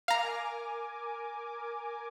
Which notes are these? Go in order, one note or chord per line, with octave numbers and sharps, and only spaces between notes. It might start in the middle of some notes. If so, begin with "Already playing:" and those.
A#4 F5 G#5 A#5 D6